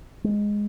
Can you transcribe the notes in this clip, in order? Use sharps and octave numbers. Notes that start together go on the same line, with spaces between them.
G#3